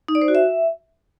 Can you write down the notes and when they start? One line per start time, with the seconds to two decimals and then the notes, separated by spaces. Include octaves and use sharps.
0.08 D#4
0.15 D5
0.22 C5
0.28 F#4
0.35 E5